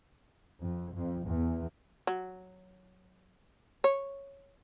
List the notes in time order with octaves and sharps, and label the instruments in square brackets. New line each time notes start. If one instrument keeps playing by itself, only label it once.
[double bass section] F2
F2
E2
[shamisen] F#3
C#5